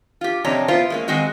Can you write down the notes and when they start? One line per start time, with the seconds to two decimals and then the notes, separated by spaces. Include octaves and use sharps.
0.21 F4 G4
0.44 F2 C3 D4 C#5 D#5 A#5
0.68 B3 E4 F4 C5
0.90 G#3 A#3 C#4
1.08 D#3 G#3 C4 F#4 D#5